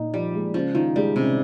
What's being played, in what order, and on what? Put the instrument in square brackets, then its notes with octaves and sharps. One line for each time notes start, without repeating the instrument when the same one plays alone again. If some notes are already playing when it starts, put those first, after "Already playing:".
Already playing: [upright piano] A#2 D#4
[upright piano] F3 [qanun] G3
[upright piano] G#3
[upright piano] C#3 [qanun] F3
[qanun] D#3 [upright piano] F4
[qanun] G3 [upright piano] G#3
[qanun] C3 [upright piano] C#4